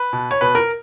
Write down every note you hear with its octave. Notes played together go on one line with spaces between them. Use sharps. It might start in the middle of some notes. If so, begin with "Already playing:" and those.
Already playing: B4
B2
C#5
B2 B4
A#4